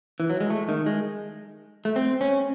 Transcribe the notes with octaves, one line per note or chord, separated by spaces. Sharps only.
E3
F#3
G#3
A3
D#3
G#3
A3
C4
C#4